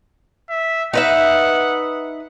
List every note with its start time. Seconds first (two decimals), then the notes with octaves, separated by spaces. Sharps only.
0.50 E5
0.93 D#4 B4 E5 F#5